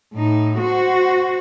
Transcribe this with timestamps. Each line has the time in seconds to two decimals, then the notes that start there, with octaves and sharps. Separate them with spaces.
0.14 A2 D#4
0.58 F#4 C5